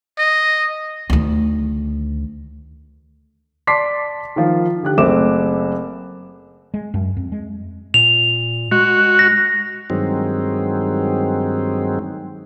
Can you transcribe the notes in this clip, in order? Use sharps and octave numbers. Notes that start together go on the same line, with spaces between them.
D#5
D2 D#3
D5 A5 C6 D6 B6 C7
D#3 F3
D3 G4 F#6
F#1 A3 C4 E5 D6 E7
G#3
F#2
F2
G#3
A#2 F7
G#3 F#4
A#6
G2 D#3 F#3 G#3 C4